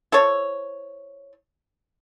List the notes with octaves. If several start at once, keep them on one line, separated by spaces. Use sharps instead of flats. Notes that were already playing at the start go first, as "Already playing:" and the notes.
E4 A4 C5 C#5